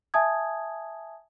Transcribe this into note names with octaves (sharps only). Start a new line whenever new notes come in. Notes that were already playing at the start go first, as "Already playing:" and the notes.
E5 G#5 A5 D#6 G#6